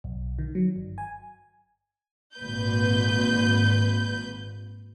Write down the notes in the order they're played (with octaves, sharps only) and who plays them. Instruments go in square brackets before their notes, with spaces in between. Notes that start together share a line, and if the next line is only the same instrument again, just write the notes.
[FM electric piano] B1
D#3
F#3
G1
G#5
[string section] G#1 A#2 B4 G6